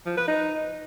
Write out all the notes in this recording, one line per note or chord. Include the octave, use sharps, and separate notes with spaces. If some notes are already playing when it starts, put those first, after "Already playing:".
F3
B4
D#4